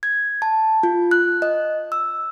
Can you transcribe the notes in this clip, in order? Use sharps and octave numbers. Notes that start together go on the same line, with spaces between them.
G#6
A5
F4
F#6
D#5
E6